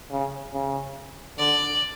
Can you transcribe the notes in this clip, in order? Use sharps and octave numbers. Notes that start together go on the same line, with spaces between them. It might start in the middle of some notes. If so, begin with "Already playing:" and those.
C#3
C#3
D3 D5